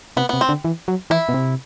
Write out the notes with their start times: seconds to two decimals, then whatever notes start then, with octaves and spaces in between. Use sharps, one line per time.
0.17 C3 B3
0.29 C3 B3
0.41 C4
0.49 D3
0.65 E3
0.88 F#3
1.10 E3 E4
1.29 B2
1.34 C3